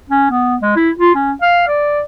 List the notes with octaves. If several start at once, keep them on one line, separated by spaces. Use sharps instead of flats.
C#4
B3
G#3
E4
F4
C#4
F5
D5